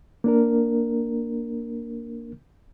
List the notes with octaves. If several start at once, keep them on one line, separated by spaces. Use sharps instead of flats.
A#3 D4 A#4